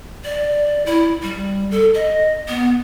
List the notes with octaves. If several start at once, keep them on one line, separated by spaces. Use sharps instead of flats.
D5
E4
G3
A4
D#5
B3